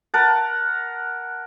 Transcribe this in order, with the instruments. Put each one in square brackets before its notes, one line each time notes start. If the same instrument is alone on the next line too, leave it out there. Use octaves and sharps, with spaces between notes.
[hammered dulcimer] A#4 F#5 A5